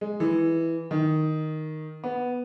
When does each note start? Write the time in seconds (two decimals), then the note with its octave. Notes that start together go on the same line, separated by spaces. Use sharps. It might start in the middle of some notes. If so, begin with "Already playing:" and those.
0.01 G#3
0.20 E3
0.91 D#3
2.04 B3